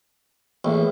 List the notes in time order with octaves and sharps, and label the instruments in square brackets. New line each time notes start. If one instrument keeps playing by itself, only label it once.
[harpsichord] A1 [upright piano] A#3 G#4 E5